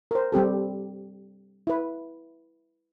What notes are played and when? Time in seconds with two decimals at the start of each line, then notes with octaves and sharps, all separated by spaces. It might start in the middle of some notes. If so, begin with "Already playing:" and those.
0.11 A#4 C5
0.32 G3 C4 G4 A4
1.67 E4 B4